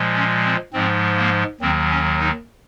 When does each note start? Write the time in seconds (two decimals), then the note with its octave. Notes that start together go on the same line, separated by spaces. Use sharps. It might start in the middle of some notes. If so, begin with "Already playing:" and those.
Already playing: A#2 F3 G#3
0.15 C#4
0.45 C4
0.73 G#2 F3 G#3 C4
1.17 A#3
1.61 D#2 D#3 F#3 C4
1.91 C#4
2.19 D#4